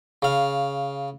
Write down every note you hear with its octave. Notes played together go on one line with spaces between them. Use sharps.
C#3 F5